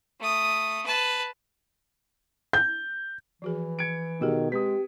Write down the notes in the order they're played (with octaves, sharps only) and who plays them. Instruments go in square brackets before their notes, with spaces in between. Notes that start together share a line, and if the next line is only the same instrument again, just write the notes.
[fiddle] A3 D#6
B4 A5
[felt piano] G6
[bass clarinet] E3 [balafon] F3 F#4 G#4
[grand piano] G#6 C#7 D7
[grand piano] B2 [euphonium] D#3 [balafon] F4 G4 G#4
[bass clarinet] G#3 [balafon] C4 B4 [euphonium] G4 [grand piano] D#6 B6